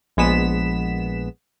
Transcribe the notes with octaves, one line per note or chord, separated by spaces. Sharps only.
A#1 G#3 B3 B6 E7